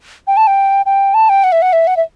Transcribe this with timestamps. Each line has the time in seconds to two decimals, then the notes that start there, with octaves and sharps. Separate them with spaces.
0.27 G5
0.37 A5
0.47 G5
0.86 G5
1.14 A5
1.29 G5
1.44 F#5
1.52 E5
1.62 F#5
1.73 E5
1.87 F#5
1.97 E5